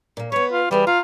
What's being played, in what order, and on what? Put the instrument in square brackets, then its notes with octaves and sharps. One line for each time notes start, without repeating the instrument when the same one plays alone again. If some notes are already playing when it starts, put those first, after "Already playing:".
[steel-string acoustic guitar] A#2 A#3
[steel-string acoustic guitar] B3 B4 [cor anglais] C#5
[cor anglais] F4
[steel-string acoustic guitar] E3 G#4 B4 [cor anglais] G3
[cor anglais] F4 [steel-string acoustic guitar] A#5